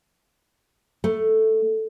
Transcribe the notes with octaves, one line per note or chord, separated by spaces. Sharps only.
A3